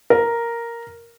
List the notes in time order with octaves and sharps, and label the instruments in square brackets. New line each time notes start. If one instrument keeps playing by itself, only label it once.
[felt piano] A#4